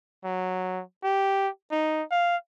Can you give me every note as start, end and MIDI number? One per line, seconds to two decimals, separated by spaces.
0.25 0.82 54
1.04 1.49 67
1.71 2.03 63
2.11 2.36 77